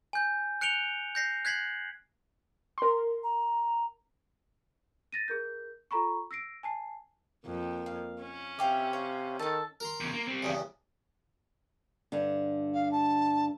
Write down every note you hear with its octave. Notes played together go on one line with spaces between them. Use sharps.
G#5 G6
F#6 C#7 D7 F7 G7
G6 A#6 C7
F#6 G#6 B6 C7 F#7
A#4 C6
A#5
A6 A#6 D#7
G#4 A#4 G6
F4 A4 A#5 B5 C#6
E6 A#6 C7 D7
G#5 A5 C7
F2 A#3
F5
C#4
C3 E5 F5 G5 D6
C#5 F5
D#3 A4 A5 E6
A#4 A#5 C6
E2 C#3
A#3
G3 C4
E2 G2 C#3
G2 D3
F5
A5